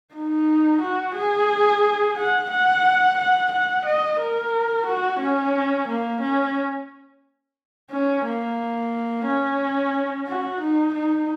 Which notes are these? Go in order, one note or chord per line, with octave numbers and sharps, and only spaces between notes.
D#4
F#4
G#4
F#5
F#5
F#5
F#5
D#5
A#4
F#4
C#4
A#3
C#4
C#4
A#3
C#4
F#4
D#4
D#4